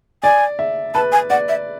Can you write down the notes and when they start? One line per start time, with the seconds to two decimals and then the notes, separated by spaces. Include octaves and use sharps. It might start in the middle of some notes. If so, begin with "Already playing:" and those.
0.23 D5 G#5
0.59 E5
0.94 B4 A5
1.12 G#5
1.30 D5 F#5
1.49 E5